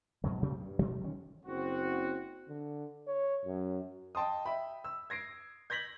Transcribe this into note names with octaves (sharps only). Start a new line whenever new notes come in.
G#2 B2 F#3
C3 F#3 A3 C4
G2
D2 B2 F#3
D3 D#3 C#4
F#1 C4 F#4
D3
C#5
F#2
D#5 G5 A5 C6 D#6
E5 G5 B5
E6
G#6 A#6 C7 D7
G6 G#6 A#6 B6 F#7